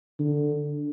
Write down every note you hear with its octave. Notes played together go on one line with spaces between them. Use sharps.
D3